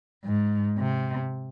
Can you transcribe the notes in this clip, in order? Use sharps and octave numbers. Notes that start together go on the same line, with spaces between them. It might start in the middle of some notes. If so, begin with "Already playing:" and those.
G#2
C3